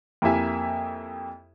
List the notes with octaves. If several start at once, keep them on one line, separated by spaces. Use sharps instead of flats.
F2 A#3 E4 G4 E5 G#5